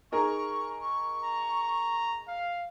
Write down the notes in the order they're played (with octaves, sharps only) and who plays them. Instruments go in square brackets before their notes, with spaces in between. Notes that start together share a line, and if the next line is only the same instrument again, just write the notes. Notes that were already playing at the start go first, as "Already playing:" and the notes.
[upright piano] D#4 G#4 A#4 [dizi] C#6
[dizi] C#6
[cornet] A#5
F5